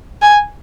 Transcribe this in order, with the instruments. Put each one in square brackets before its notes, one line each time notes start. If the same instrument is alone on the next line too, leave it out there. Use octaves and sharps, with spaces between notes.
[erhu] G#5